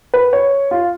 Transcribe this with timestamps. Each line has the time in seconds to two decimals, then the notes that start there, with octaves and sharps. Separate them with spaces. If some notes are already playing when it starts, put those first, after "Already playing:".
0.14 B4
0.33 C#5
0.71 F4